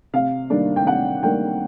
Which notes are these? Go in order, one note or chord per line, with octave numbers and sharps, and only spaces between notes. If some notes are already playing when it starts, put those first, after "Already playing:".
C3 F5
D#3 G3 A#3 D4
G5
C3 F#5
D#3 G3 A#3 D4 G5